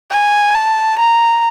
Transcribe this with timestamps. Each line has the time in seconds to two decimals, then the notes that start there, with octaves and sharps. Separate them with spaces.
0.11 G#5
0.55 A5
0.98 A#5